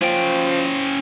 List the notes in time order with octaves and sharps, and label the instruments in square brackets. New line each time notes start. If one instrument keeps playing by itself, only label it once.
[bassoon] F3 [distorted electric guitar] C#4 G5